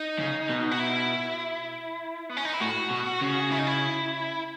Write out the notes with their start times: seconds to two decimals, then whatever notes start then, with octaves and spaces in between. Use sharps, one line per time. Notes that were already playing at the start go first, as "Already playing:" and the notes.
Already playing: D#4
0.19 C#3
0.49 B2
0.71 F#4
0.80 E4
2.29 B3
2.37 C#4
2.45 D#4
2.54 E4
2.61 A2 F#4
2.91 B2
3.21 C#3
3.52 E4
3.59 D#4
3.67 E4